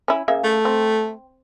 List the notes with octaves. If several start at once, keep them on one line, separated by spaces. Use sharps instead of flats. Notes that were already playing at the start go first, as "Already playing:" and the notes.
C#4 E4
C#3 A#3 E5
A3
C4